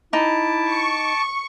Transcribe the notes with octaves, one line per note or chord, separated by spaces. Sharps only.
D#4 E4 A5 D6
C#6